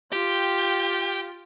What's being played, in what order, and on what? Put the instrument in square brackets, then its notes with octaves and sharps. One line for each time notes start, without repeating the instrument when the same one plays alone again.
[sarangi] F4 [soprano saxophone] G4 [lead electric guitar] G5